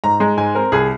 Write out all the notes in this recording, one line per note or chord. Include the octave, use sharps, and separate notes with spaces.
G#2 A#5
G#3 A#5
G#2 G#5
C4 A#4
C2 G#4